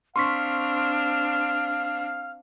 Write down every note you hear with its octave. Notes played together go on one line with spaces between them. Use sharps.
C4 D4 F5 C6 C#6 F6 B6